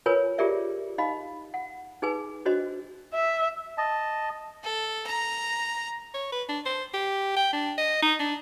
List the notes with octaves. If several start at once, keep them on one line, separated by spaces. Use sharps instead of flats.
F4 A#4 B4 C#5 G#5
F4 G4 G#4 A#4 D5 E5
D#4 D#5 F5 B5
F#5
D#4 G#4 B4 G#5
D4 F#4 C5 D#5
E5
D#5 A5
A4
A#5
C#5
B4
D4
C5
G4
G5
D4
D#5
D#4
D4